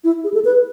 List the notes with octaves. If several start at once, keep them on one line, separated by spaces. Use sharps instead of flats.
E4
G#4
A4
B4